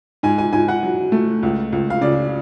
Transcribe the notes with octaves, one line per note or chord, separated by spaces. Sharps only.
G#2 G#5
G#5
G#2 G#5
F#5
F#3
A3
C#2
C#2
F5
C#3 D5